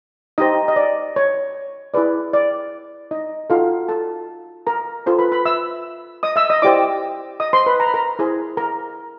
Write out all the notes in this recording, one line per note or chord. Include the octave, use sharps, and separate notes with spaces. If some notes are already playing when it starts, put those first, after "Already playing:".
D#4 G4 C5 D#5
D#5
D5
C#5
E4 G#4 B4 D5
D5
D#4 D#5
D#4 F4 F#4 A4 F5
A4 A5
A#4 A#5
F4 A4 C5
B4 B5
B4 B5
E5 E6
D#5 D#6
E5 E6
D#5 D#6
E4 G4 C5 D5 D6
D#5 D#6
C5 C6
B4 B5
A#5
B5
A#4 A#5
E4 G#4 C5
A#4 A#5